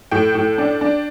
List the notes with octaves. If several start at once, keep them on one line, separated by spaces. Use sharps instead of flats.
A2 G5
A2
D4
D4